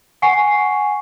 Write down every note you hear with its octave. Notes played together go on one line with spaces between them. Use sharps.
F#5 G#5 C#6 C7